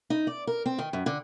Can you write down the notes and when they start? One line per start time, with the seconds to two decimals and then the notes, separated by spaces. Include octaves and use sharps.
0.10 D#4
0.27 D5
0.47 A#4
0.66 C4
0.79 D#3
0.93 F#2
1.06 D3